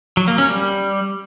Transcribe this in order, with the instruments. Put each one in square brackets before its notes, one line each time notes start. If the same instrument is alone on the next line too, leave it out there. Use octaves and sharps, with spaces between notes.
[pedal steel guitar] F#3
A#3
C#4
G3